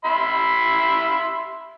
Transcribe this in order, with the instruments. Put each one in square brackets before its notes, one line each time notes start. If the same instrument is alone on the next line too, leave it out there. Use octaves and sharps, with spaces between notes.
[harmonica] E5 B5 C6